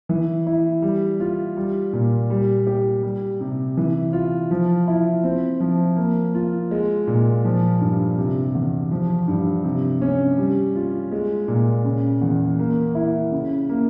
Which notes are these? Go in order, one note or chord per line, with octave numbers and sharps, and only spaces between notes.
E3
E4
G3
F4
G3
A#2
G3
G4
G3
C3
E3
F4
F3
E4
C4
F3
A#3
F4
G#3
A#2
F3
G2
C3
E2
F3
G2
C3
C#4
G3
F4
G#3
A#2
C#3
E2
A#3
E4
C#3
A#3